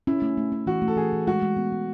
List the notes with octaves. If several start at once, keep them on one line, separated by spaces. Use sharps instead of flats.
C#4 E4
A3
A3
C#4
E3 F#4
A3
A4
E3 G#4
E3
G#3 F#4
G#3
B3
G#3